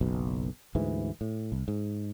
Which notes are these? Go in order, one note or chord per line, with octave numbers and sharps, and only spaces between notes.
F#1 B1 B2
D2 G#2 E3
A2
C2
G#2